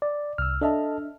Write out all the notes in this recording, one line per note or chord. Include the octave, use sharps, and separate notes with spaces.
D5
C2 E6 F6
D4 A4 D#5 E5 A5 F6